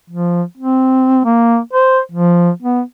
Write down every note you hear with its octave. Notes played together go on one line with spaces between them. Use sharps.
F3
C4
A#3
C5
F3
B3